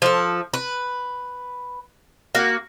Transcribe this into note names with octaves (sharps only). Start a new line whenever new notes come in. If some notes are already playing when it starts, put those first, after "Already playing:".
F3 A4
B4
A#3 F#4